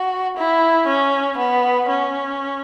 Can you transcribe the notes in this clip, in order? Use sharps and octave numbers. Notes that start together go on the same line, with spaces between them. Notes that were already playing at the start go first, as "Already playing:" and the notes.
Already playing: F#4
E4
C#4
B3
C#4